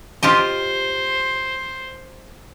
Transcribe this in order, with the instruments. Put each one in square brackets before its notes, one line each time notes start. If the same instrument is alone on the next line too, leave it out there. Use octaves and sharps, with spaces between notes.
[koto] F4 G4 D#5 [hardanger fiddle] C5